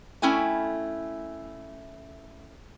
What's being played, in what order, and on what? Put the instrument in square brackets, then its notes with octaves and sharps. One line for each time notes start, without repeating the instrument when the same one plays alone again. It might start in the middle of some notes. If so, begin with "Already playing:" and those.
[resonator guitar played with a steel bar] A3 C#4 E4 G5 G#5